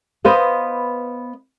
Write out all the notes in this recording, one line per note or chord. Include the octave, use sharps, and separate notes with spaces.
B3 B4 C5 D#5 F5